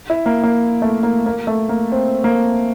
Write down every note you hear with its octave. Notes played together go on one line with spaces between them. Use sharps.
E4
A#3
A#3
A3
A#3
A#3
A3
A#3
C4
A#3